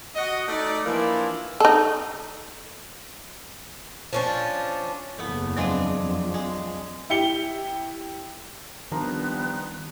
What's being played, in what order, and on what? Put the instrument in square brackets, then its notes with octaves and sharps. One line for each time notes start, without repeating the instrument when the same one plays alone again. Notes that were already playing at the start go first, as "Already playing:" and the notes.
[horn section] F#4 D#5
A3 D#4 D5
E3 F3 A#3 D4 E4
[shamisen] D#4 A4
[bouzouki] F3 C#4 D4
[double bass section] F#1 E2 [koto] A3 B3
[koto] F3 G#3 D4 [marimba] F#3 C4
[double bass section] F2
[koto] G#3
[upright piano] E4 G4 C#7 G7
[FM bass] D#3 [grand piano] F3 D4 A#5 [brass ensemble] G3 C4 G4 [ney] B3